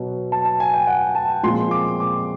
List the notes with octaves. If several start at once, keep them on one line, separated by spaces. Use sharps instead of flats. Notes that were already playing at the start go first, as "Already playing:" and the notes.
Already playing: B2 F#3
A5
A5
G#5
G5
F#5
A5
A#2 F3 G#3 C4 C6
D6
D6